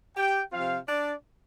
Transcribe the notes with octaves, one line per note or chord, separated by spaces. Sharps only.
G4 G5
C3 F3 C4 F4 F5
D4 D5